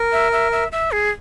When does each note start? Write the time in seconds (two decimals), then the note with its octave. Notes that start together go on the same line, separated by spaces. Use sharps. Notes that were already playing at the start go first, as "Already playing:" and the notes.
Already playing: A#4
0.12 E5
0.32 E5
0.52 E5
0.72 E5
0.92 G#4